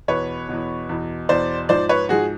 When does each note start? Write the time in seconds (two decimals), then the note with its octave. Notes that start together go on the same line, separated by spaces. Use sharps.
0.08 E2 B2 B4 C#5
0.49 E2 B2
0.89 E2 B2
1.29 E2 B2 C5 D5
1.69 G#2 F3 C5 D5
1.89 B4 C#5
2.09 G#2 F3 F#4 G#4